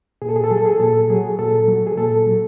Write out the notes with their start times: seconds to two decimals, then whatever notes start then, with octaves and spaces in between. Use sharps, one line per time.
0.22 A#2 G#4
0.29 A4
0.36 G#4
0.44 A4
0.51 F#3 G#4
0.58 A4
0.66 G#4
0.80 A#2 A4
1.10 F#3 G#4
1.39 A#2 A4
1.68 F#3
1.87 G#4
1.97 A#2 A4
2.27 F#3